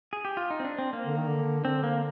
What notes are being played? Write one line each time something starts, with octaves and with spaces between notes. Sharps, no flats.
G#4
G4
F4
D#4
C4
D4
C4
A#3
D3
D#3
D3
D3 C4
A#3